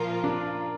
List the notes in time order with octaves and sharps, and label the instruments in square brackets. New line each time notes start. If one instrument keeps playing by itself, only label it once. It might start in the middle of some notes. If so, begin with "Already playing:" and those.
Already playing: [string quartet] A#2 F3 A#3 F4 [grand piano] A#4
[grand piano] D4